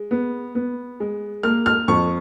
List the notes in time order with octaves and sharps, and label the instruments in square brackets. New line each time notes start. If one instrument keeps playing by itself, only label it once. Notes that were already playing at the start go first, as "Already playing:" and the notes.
Already playing: [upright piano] G#3
B3
B3
G#3
A#3 F6
F6
F2 C#6